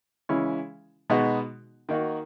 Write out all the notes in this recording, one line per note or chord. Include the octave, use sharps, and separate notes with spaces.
C#3 E3 G#3 C#4 E4
B2 G#3 B3 D#4 F#4
D#3 A#3 D#4 F#4